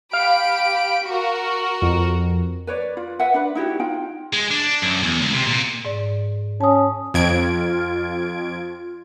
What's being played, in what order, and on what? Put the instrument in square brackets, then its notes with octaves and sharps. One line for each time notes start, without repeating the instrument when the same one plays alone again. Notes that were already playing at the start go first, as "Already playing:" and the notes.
[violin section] G4 B5 D7 [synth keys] F5
[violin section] F#4 A#4
[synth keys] F2
[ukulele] B4 C#5 D5
F4
B4 E5 F#5
D4 B4
D#4 E4 F#4 G4
D#4 F4 G5
[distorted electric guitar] G#3
D4
F#2
E2
C#2
C3
A#2
[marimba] G#2 D5
[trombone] C#4 [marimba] A5 D#6
[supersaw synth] F2 G#6 D7 [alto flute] F4